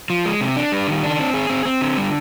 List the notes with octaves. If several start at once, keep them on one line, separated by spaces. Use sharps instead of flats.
F3
G#3
C3
D4
G3
D#3
D4
C4
G#4
C4
C4
D3
G3